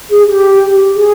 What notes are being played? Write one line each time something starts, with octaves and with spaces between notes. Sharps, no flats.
G#4
G4
G#4